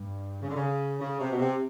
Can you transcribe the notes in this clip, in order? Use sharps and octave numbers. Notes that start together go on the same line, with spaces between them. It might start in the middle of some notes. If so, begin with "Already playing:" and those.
Already playing: G2
C#3
D3
C#3
C#3
C3
B2
C3